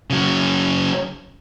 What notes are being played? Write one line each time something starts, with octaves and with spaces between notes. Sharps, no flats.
C#3 F#3